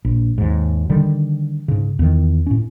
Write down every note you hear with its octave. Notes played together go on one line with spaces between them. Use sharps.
A#1
D#2 G#2
D3 D#3 G3
G#2 C#3
E2 D#3
A2 C#4